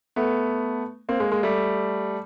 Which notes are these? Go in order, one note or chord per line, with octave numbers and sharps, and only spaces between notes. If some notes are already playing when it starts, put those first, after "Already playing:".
A3 B3
A#3 C4
G#3 A#3
G#3 A#3
G3 A3